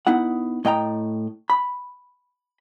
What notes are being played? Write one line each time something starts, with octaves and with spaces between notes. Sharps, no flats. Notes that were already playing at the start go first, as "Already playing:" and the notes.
B3 D#4 E4 F#5
A2 D#5 G5 A#5
B5